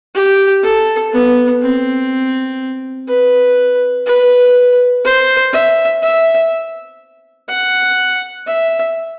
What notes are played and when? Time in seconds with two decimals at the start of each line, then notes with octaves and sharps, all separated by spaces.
0.15 G4
0.64 A4
1.13 B3
1.62 C4
3.08 B4
4.06 B4
5.05 C5
5.53 E5
6.03 E5
7.49 F#5
8.47 E5